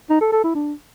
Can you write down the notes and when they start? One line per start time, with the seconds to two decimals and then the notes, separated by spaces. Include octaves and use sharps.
0.10 D#4
0.21 A4
0.32 A4
0.44 E4
0.55 D4